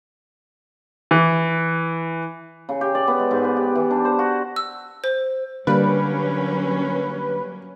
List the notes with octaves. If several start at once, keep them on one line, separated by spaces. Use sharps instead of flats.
E3
C#3
G4
D5
B3
G#3
G#2
B4
G4
E3
D4
C5
F#4
E6
C5
D3 F#3 G3 A#3 C#4 B4